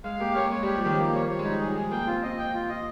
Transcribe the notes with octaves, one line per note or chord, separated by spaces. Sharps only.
G#3 F5
A#3 G4
A#3 C#5
G#3 C#5
G3
G4
F3
D#3 G4
F3 A#3
G3 C#5
F3 C#5
G#3
G3 D#4
F3 G#4
G#3 G#4
A#3 G5
C4 F4
C4 D#5
G5
F4
D#5